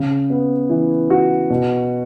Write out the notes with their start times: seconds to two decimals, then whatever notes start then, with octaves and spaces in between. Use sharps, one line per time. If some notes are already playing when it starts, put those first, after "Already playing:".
Already playing: C#3
0.30 B3
0.70 E3
1.10 F#4
1.50 B2